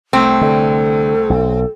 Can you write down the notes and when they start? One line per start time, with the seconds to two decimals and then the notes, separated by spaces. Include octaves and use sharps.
0.13 C2 A3 C4
0.41 D3 A4
1.30 B1